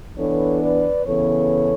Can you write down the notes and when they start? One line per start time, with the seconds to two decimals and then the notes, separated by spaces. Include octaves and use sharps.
0.18 E3 B3 D4 A4 C#5
0.63 B4 D5
1.06 C#3 E3 B3 A4 C#5